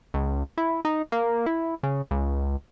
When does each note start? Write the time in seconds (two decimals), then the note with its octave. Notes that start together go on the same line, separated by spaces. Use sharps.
0.14 C#2
0.57 E4
0.85 D#4
1.12 A#3
1.46 E4
1.83 C#3
2.11 C#2